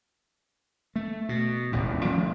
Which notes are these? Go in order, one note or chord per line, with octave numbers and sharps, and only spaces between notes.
A3
B2
E1 A1 D#2
F3 A3 A#3 C#4